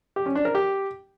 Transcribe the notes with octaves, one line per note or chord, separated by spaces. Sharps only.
G4
C#4
D4
A#4
G4